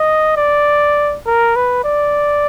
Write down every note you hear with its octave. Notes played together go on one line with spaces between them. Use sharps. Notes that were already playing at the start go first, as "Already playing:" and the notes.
Already playing: D#5
D5
A#4
B4
D5